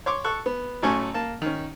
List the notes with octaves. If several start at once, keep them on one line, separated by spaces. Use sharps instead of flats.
C#5 C6 D6
A4 C#6 F#6
B3
A1 F#3 A3 C#4 G#5 C#6
A#3 A5
D#3 C#4